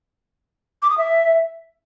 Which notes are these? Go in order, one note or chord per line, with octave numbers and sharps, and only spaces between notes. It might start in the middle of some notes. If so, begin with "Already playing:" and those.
D6
D#6
E5